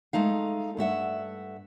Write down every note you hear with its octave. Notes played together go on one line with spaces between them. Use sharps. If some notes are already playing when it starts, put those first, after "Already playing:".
G#3 A3 D#4 F5
G2 A3 E5 F#5